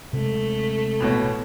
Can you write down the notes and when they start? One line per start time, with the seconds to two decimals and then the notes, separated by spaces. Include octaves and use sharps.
0.13 C3 G#3 A3
1.00 A1 B2 C#5